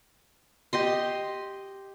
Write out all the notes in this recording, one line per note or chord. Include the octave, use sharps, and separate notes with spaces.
G4 D#5 C6